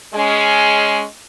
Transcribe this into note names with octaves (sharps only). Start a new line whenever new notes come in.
G#3 C#4